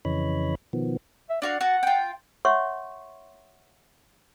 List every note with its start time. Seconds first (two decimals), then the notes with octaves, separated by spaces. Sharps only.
0.05 F2 C#3 E3 C#5 D#5 B5
0.73 B2 D#3 F3 B3
1.29 E5
1.42 D4 F#4 D5 F5
1.61 F#4 F#5 A5
1.83 F4 G5
2.45 C#5 E5 F#5 C6 C#6